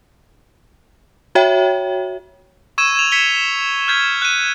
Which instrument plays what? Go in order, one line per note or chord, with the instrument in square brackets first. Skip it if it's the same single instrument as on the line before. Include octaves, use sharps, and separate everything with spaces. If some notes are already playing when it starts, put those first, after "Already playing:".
[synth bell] F#4 C#5 E5 G5
[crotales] C#6 E6 G#6 D#7 E7
G#6 F7
G#6 B6 C#7 D#7 F7 G7
F6 G6 G#6 B6
F#6 D#7